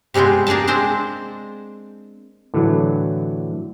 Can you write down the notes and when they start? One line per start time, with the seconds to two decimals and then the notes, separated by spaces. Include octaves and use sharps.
0.14 C3 G3 G#3 B3 C4
0.47 A#3 D4 G#4 G5 A5
0.67 G#3 C4 D4 C5
2.54 A2 D3 E3 F#3